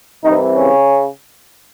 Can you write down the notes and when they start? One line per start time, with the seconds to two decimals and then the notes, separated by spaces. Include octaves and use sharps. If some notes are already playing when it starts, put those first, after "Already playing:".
0.24 C2 C3 D#3 E3 D#4
0.56 C#3 C#4